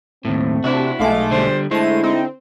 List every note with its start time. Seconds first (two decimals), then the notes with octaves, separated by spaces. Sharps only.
0.25 D#2 A2 A3 C4
0.64 C3 D4 E4 F#4
1.00 B1 G#3 A3 F5 D6
1.31 D3 G3 C5
1.71 D3 G#3 A3 E4 C5 D#7
2.03 C4 D#4